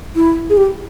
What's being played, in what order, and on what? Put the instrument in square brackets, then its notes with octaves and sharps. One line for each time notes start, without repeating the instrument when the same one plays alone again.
[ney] E4
G#4
G4